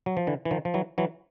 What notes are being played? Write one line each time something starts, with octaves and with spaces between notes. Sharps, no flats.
F#3
F3
D3 E3
E3
D#3 F3
F3
E3 F#3
E3 F#3